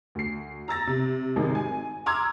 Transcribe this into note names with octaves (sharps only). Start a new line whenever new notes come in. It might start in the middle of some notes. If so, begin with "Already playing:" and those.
D2 C7
A#5 E6 A6 A#6
C3
G#1 C3 D#3 G#3 D#4
G#5
A#5 C6 D6 E6 F6 G#6